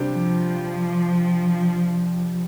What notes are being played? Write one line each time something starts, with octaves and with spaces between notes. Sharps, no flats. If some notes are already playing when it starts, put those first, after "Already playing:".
Already playing: C3 G3 D4 G4
F3